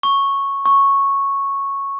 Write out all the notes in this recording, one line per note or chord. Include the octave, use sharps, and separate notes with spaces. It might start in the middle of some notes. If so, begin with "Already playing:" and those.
C#6
C#6